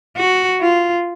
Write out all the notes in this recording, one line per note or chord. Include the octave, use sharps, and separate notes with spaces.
F#4
F4